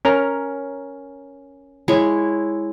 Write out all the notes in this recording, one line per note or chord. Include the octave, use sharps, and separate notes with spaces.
C#4 A#4 A#5
G#3 E4 C#5